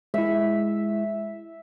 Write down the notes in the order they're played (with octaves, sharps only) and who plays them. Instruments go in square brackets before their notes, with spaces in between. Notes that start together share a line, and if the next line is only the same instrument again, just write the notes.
[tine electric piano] G#3 E4 [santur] E5